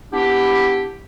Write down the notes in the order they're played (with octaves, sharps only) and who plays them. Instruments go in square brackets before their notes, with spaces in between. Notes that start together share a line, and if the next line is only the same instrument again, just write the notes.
[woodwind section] B3 D4 E4 G4